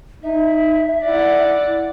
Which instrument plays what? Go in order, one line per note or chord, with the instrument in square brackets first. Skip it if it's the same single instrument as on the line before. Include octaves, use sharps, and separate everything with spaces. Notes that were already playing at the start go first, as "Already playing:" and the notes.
[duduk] D#4 [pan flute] E5
[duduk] E4 [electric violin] D5 F#5